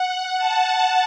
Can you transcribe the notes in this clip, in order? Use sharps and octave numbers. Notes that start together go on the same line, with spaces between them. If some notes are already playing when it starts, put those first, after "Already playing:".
Already playing: F#5
A5